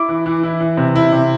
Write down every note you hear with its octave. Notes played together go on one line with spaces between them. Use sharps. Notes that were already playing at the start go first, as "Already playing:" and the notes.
Already playing: E4 D6
E3
E3
E4
E3
C3
E4
C3